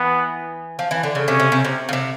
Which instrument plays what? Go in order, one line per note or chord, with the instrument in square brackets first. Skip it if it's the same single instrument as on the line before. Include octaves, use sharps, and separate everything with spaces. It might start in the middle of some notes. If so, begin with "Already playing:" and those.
Already playing: [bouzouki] E3 [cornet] B3
[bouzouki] F3
E3
D3
C#3
[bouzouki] C3 [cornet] C#4
[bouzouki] C3
C3
C3
C#3
C3